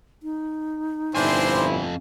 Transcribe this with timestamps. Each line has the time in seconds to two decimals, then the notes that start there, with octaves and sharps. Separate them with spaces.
0.23 D#4
1.15 G1 F2 A#2 C4 D4 E4 C5 G#5